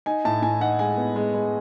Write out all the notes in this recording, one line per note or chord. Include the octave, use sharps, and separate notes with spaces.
D#4 G#5
A2 A5
A2 G#5
D#4 F#5
G#3 G#5
B3
G#3
G#3